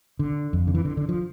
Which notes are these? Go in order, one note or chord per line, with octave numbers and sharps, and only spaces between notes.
D3
F2
D3
E3
D3
D3
F3